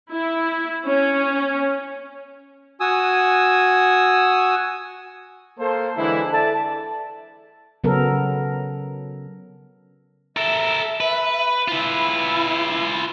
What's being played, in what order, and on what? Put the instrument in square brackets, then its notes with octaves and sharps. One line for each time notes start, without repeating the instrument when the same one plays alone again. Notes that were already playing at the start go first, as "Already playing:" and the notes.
[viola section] E4
C#4
[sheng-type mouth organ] F#4 G#5 D#6 E6
[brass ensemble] A#3 A4 C5
D3 E3 G#3 D4 E4
A4 D5 E5 A5
[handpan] C#3 F#3 B3 C#4 A4 A#4
[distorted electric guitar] A4 A#4 [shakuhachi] E5
[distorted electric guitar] B4
[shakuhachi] E4 [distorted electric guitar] F4 B4